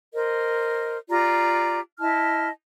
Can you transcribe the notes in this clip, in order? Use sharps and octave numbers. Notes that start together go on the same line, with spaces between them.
A#4 C5 D#5
F4 G4 D5 A#5
E4 D#5 A5 F6